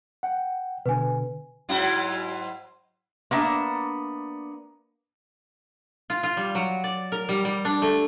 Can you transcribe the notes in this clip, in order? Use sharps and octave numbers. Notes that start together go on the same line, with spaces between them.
F#5 G5
B2 D3 B4 G#5
G#2 F#3 E4
A#3 B3 D4 E5
F4
F4
G3
F#3
D5
A#4
G3
G3
D4
A3